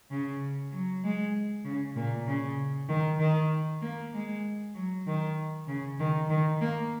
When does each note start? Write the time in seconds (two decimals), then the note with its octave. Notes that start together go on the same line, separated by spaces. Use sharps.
0.10 C#3
0.72 F#3
1.04 G#3
1.65 C#3
1.96 A#2
2.27 C#3
2.89 D#3
3.20 D#3
3.82 A#3
4.14 G#3
4.75 F#3
5.07 D#3
5.68 C#3
6.00 D#3
6.30 D#3
6.61 A#3